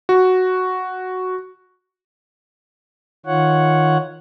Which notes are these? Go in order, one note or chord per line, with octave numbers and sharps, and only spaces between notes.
F#4
D#3 F4 C#5 F#5